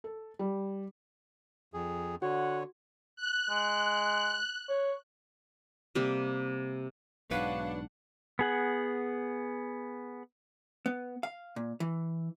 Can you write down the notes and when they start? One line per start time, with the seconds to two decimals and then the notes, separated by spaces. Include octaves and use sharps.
0.04 A4
0.39 G3
1.74 F2 G#4
2.22 D3 F#4 C#5 F#5
3.16 F#6
3.50 G#3
4.69 C#5
5.95 C3 G3 A#3
7.31 B1 G#2 D4 F#4 B4 C#5 F5 F#5
8.39 B3 G#4 F#5
10.86 B3
11.23 F5
11.56 A#2
11.80 E3